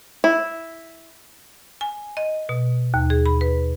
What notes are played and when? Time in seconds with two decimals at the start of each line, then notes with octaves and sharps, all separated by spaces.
0.24 E4
1.81 G#5
2.17 D#5
2.49 B2
2.94 D#2
3.10 G#4
3.26 B5
3.41 B4